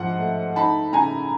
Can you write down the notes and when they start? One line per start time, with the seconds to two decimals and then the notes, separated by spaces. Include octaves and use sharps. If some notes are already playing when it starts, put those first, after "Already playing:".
Already playing: G#2 F3 F#5
0.19 A3
0.56 D#4 A5 B5
0.93 C#3 G#5 A#5